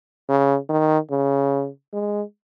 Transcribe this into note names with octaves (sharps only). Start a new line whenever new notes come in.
C#3
D#3
C#3
G#3